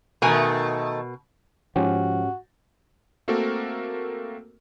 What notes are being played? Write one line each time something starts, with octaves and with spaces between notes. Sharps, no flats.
B2 D#3 A3 A#4 G#5
G#2 F3 C#4 F#4 G4
A3 A#3 C4 F#4 A4 A#4